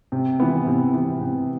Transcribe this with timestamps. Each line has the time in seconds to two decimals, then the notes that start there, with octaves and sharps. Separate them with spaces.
0.12 C3
0.40 E3 B3
0.67 C3
0.94 E3 B3
1.21 C3